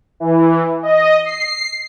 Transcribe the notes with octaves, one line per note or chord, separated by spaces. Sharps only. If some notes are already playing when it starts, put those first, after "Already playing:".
E3
D#5
C7